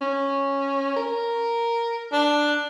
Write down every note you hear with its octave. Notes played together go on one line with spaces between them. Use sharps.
C#4
A#4
D4